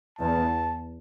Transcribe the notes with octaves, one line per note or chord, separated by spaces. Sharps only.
E2 A5